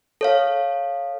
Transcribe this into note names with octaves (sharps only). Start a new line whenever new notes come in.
A4 C#5 F5